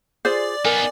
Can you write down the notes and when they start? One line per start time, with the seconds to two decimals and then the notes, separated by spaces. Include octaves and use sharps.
0.25 F4 G#4 C5 D5
0.65 B3 D#4 A#4 G#5